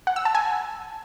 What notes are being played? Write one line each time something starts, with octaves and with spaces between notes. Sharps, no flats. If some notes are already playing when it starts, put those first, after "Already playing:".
F#5
E6
A5
G#5